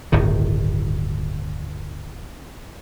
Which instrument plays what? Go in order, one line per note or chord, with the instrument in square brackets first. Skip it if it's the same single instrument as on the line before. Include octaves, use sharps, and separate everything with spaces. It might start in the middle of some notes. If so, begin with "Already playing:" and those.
[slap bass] D1 G1 A2 D#3